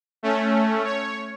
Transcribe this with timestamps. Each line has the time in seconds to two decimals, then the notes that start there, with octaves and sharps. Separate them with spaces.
0.23 A3 C#4
0.84 C#5